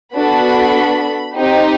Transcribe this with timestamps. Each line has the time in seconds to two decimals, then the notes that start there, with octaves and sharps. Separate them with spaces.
0.14 B3 D4 F#4 A4 B5
1.36 C4 D#4 G4